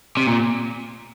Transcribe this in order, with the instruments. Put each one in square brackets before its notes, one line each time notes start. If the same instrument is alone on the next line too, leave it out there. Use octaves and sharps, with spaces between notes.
[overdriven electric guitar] C3
A#2